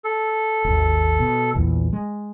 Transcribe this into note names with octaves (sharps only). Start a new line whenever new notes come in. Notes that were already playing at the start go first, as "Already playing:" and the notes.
A4
G#1 D#2
B2
A#1 E2 E3
G#3